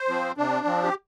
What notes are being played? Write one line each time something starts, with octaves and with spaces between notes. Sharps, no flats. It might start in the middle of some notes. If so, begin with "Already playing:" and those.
Already playing: C5
F3 C4
C3 D4
F3 C4
G4